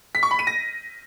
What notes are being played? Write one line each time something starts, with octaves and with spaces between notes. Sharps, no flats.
B6
C#6
B5
D#7
A#6